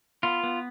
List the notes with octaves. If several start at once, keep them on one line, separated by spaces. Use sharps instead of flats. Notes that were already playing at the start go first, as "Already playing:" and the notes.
B3 F4
B3